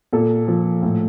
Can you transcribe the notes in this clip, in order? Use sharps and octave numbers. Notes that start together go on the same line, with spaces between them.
A#2 A4
F3
A2